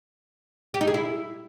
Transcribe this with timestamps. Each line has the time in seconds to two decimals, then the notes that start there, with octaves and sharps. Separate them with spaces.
0.74 G4
0.81 D#4
0.87 G#4
0.94 E4